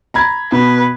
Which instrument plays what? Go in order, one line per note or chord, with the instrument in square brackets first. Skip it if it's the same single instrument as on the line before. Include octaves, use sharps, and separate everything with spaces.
[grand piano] A#5 B5 G#6
[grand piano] B2 [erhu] B4